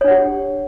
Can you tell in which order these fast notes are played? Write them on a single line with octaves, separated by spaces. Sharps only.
C#5 D4 F#5 G4